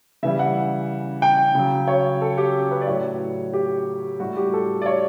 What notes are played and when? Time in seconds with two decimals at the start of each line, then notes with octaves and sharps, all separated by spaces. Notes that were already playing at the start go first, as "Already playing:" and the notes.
0.23 C#3 E3 G3 E5
0.39 F#5
1.22 G5
1.55 C#3 F#3
1.88 C#5
2.21 A4
2.38 G4
2.71 B4
2.81 D5
2.87 A2 F#3 C#5
3.54 G4
4.20 A2 G3 F#4
4.37 G4
4.53 A4
4.82 D5
4.86 C#5